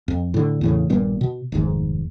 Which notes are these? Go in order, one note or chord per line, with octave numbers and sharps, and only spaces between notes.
F2
A2 D3
E2 A2 C#3
D#1 G2 A#2 B3
B2
F1 D#2 G#2